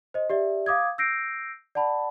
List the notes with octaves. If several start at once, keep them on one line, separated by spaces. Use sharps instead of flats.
C5 D#5
G4 D5 E5
F5 D6 D#6 G#6
E6 G6 A#6 C7 D7
D5 F#5 A5 B5